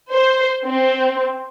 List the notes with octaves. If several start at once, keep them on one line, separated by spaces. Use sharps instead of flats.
C5
C4